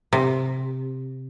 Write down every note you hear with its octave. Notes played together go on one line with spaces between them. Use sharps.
C3